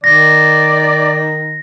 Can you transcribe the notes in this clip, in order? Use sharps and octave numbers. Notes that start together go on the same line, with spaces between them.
D#3 D5 A#6